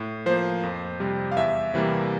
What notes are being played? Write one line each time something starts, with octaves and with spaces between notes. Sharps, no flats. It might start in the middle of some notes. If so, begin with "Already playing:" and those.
Already playing: A2
F3 A#3 C5
F2
C3 G3
F5
E2 E5
C3 E3 G3 A#3